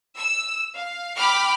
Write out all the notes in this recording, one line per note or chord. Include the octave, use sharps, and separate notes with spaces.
E6
F5
G5 B5 D6 F6